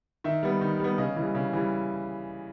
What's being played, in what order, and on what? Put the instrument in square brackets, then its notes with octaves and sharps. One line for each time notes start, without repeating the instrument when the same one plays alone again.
[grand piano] D#3 E5
G3 B3
D#3
G3 B3
C#3 D#5
E3 G3
C#3
E3 G3